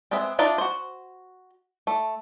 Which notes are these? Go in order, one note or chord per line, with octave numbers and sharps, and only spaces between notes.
G#3 B3 C4 G#4 E5
D4 D#4 F4 E5
F#4 C5
A3